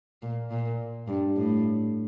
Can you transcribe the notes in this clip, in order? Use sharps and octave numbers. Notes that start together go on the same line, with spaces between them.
A#2
A#2
G2
A2